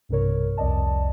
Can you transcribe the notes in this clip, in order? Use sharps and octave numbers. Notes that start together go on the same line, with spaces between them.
B1 G2 C3 A#4 C#5
C2 F2 D5 D#5 A5